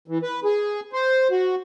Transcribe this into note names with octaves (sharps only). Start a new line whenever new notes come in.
E3
B4
G#4
C5
F#4